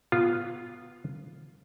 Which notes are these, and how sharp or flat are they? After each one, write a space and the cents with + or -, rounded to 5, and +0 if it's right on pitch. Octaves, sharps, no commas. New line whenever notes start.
B3 +0 F4 +0